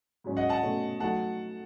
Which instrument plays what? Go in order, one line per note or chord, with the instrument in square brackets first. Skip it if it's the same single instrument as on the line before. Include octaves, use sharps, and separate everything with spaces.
[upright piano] G#2 F#3 C#4
[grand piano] D#5 F#5
F#5 A5
[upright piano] B2 A3 C#4
[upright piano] F#3 A3 D#4 [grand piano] F#5 A5